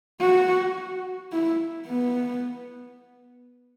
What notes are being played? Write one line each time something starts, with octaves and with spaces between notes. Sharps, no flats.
F#4
E4
B3